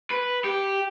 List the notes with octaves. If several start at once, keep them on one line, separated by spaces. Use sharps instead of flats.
B4
G4